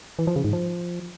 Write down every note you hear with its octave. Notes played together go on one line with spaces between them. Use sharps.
E3
F3
C#3
G#2
F3